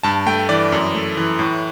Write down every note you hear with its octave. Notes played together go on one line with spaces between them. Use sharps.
G2 A5
A3 G5
E3 D5
F#2
A3
E3
A2